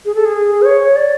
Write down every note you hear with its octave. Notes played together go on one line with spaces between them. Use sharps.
G#4
A4
G#4
C5
C#5
D5